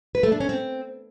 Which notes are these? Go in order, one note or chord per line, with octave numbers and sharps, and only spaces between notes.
B4
A3
D4
C#4
C4